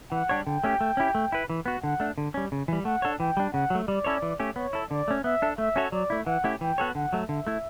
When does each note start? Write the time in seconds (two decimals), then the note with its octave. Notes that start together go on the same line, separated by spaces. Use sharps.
0.12 E3 F#5
0.29 G3 D4 G4 C#5
0.46 D3 G5
0.64 A3 C#4 G4
0.81 A3
0.97 C#4 E4 G4
1.15 A3
1.32 E4 B4
1.50 E3
1.66 B3 F#4
1.83 D3 F#5
2.00 A3 D4
2.18 D3
2.34 G3 C#4
2.52 C#3
2.68 E3 G3
2.85 A3 F#5
3.02 D4 A4 C#5
3.20 E3 G5
3.37 G3 D4
3.53 C#3 F#5
3.70 F#3 A3
3.88 G3 D5
4.05 C#4 E4 A4 C#5
4.22 E3
4.40 A3 C#4 G4
4.56 B3 C#5
4.73 E4 A4
4.90 D3 D5
5.08 A3 C#4
5.24 B3 E5
5.42 D4 A4
5.58 A3 E5
5.76 C#4 F#4 A4 C#5
5.92 F#3 D5
6.10 A3 E4
6.27 E3 F#5
6.44 A3 C#4 E4 G4
6.61 E3 G5
6.78 B3 F#4 A4 C#5
6.95 D3 F#5
7.13 F#3 A3
7.29 D3 E5
7.47 A3 E4